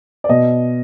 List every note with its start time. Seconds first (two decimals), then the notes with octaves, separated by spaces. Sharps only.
0.24 D5
0.29 B2 D#5